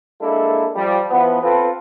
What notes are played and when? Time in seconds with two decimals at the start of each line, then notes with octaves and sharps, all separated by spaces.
0.21 G#3 A#3 D4 E4 A4
0.76 F3 G3
1.11 E3 F3 B3
1.42 C4 F4 A4 B4